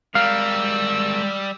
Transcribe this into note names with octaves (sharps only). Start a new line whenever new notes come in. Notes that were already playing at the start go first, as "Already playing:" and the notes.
G3 G#3 A#4 F5 E6